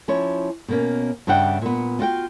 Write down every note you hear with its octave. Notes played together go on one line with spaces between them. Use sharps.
F3 C#4 E4 C#5
B2 A#3 C#4
G2 C#3 D4 E5 F#5 G5
A#2 B3
F4 F#4 F#5 G5